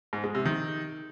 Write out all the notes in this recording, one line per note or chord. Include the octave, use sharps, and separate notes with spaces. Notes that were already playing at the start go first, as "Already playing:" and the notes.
G#2
G#3
C3
D#3